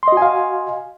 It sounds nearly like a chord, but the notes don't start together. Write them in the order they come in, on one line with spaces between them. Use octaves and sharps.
C6 D#5 F#4 G#5 F5